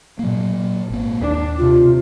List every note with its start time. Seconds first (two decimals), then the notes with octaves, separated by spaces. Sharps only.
0.19 A#2 F#3 A#3
0.90 G#1 A#3
1.22 D#2 D4
1.58 C3 F4